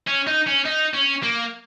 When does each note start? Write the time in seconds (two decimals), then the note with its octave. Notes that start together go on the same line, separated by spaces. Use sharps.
0.08 C#4
0.27 D#4
0.47 C#4
0.65 D#4
0.94 C#4
1.23 A#3